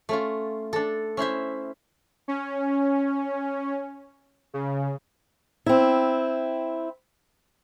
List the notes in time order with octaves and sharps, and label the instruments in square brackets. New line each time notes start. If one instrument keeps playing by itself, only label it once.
[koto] A3 C#4 F4
D4 A4
C#4 E4 C5 E5
[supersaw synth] C#4
C#3
[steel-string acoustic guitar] C4 E4